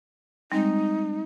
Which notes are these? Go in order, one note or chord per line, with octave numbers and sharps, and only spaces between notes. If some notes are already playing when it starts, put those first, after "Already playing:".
G3 G#3 C4 D#4